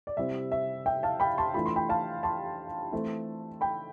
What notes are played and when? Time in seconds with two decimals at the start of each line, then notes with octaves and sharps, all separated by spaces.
0.07 D5
0.17 C3 G3 C4 E4 E5
0.52 E5
0.86 E5 G5
1.03 F5 A5
1.20 G5 B5
1.38 A5 C6
1.54 E3 A3 D4 F4 B5
1.66 C6
1.76 G5 B5
1.89 F5 A5
2.23 A5 C6
2.92 E3 A3 C4 E4
3.61 G5 B5